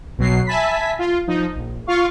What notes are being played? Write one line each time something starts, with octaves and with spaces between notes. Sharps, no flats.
B1 B2 F#3 C7
E5 G#5 A5 B5 B6
F4
F3 D#4
A#1
F4 F5 C#6